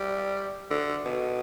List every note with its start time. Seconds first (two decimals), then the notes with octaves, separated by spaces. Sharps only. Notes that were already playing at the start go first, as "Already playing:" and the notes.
Already playing: G3
0.71 D3
1.05 B2